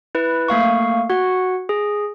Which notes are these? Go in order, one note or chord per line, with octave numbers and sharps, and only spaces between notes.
E4 B4
A3 A#3 F5 C#6
F#4 F#5
G#4